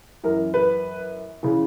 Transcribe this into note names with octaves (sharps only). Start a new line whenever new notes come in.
F#2 E3 A#4
B4
C#3 E3